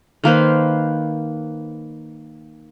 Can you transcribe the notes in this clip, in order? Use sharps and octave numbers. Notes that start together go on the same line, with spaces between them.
D#3 A#3 B4 C5